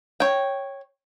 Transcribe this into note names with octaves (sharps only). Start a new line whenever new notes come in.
C#5 G5